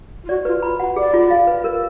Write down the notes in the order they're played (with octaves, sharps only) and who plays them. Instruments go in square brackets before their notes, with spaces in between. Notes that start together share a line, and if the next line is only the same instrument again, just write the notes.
[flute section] F4
[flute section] F#4 [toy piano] D5
[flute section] F4 [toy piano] B4
[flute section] F4 [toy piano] B5
[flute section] F#4 [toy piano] F#5
[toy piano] G#4 [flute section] D5
[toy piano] F4
F5
B4
A#4